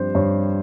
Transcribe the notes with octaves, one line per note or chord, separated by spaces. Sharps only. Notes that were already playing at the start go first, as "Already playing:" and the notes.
Already playing: G2 F3 C4 G4 C5
G2 C#5